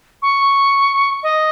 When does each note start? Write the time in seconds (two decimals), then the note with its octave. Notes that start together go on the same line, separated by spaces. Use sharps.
0.22 C#6
1.23 D#5